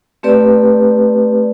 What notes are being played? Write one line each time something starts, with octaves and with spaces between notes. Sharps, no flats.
A3 C4 G4 B4 D5